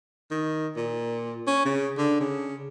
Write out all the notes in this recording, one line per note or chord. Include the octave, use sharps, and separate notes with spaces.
D#3
A#2
C#4
C#3
D3
C#3